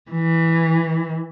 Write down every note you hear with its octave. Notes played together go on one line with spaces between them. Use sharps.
E3